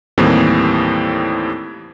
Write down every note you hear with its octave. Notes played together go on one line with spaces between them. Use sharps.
D#2 A2 E3 G3 A#3 C4